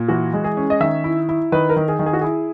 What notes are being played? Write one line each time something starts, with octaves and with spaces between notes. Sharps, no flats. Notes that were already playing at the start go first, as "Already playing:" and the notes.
Already playing: A#2
E3 F#4
G#3
G#4
C#4
D#5
D#3 E5
E4
E4
D#3 B4
A#4
D#3
G#4
D#3
G#4
F#4
E4 G#4